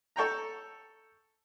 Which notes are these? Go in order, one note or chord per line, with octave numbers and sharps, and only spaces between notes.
A4 C#5 G5 A#5